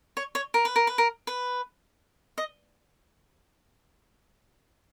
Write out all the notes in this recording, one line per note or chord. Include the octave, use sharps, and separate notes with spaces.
C#5
C#5
A#4
B4
A#4
B4
A#4
B4
D#5